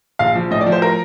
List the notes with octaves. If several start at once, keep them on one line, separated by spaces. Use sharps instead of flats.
A#1 F5
F3
A2 D#5
D5
F3
C5
A#4